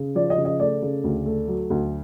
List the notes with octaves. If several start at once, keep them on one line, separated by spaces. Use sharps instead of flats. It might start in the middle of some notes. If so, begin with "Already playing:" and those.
Already playing: C#3
F3 D5
D#5
C#3
D#5
A3 D5
C#3
D2
A3
F#3
D2